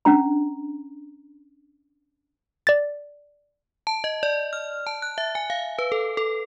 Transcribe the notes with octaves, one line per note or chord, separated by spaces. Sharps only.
C#4 D4 A#5
D5 A6
A5
D#5
D5
F6
A5
F#6
E5
G#5
F5
B4
A4
A4